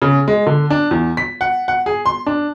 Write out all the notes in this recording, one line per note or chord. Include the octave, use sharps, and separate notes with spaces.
C#3
G#3
D3
D4
E2
B6
F#5
F#5
G#4
C6
D4